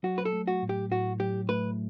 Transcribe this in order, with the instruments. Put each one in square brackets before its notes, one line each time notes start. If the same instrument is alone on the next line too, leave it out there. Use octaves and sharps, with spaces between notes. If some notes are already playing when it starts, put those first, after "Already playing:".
[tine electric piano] F#3 [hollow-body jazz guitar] F#4
[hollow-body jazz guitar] B4
A4
[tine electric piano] A3
[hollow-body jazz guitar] F#4
[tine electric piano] A2
[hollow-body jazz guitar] G4
[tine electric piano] A2 [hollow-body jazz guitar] F#4
[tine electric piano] F#3 [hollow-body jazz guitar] G4
[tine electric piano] A3 [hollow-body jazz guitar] B4